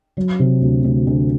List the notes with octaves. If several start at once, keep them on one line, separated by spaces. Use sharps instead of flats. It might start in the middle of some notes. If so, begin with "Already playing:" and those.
F#3
C3
D2
D2
D2